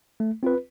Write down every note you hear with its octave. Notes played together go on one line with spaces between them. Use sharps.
A3
C4 F4 B4